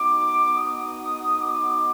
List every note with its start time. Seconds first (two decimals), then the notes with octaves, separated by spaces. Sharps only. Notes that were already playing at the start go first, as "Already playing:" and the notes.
Already playing: B3 D#4 F#4 D6
0.56 D#6
1.38 D6